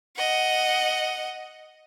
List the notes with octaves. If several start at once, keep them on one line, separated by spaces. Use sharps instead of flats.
D#5 F#5